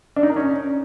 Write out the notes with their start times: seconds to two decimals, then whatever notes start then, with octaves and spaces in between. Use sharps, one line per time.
0.16 D4
0.23 D#4
0.30 A#4
0.36 C#4